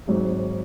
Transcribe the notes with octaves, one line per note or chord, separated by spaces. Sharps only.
G#1 G#2 F#3